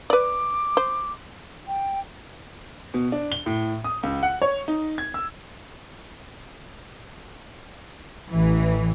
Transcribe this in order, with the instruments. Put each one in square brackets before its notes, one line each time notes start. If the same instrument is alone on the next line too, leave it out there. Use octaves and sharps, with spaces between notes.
[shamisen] B4 D5 [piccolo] D6
[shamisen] C5
[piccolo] G5
[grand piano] B2
D4
G7
A2
D#6
C#2
F#5
C#5
D#4
G#6
E6
[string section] A1 E3